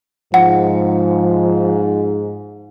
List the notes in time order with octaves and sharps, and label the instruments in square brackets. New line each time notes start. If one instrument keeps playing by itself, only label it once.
[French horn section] G#2 [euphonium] F3 [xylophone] F#5